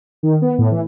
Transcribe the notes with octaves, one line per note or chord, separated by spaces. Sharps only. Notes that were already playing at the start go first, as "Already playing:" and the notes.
D#3
B3
A2
E3